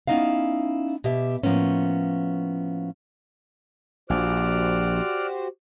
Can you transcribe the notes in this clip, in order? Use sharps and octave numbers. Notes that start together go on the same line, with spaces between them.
B3 C#4 D#4 E4 F5
B2 G4 E5
A2 F3 A#3 B3 C#4
A#1 F#4 G4 C5 D5 F6 F#6